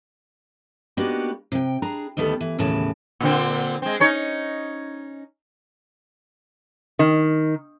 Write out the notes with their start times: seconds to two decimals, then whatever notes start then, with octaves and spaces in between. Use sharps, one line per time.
0.97 A#3 B3 D4 D#4 F#4 G4
1.52 C3 G5
1.82 D4 G#4 A#5
2.17 D2 D#3 G3 B3 A4
2.41 E3
2.58 D#2 A2 C#3 E3 A5
3.20 A#2 D3 C4
3.82 G#3 C4
4.00 C#4 D#4 C#5
6.99 D#3